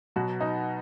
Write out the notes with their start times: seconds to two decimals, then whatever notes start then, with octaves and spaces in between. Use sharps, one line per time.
0.16 B2 F#3 B3 F#4
0.41 D#4